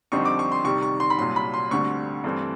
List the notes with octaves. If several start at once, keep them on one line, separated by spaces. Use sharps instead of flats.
F2 D3 G3 C4 D#4 C#6
D6
C#6
C6
C3 D#3 G3 C#6
C#6
C6
B5
C2 A#2 F#3 C6
B5
C6
D2 D3 G3 C4 C#6
G2 E3 A3 C4